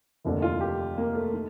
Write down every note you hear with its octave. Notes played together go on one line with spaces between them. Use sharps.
F1 D#2 D3
F4
G4
A#3
A3
D#3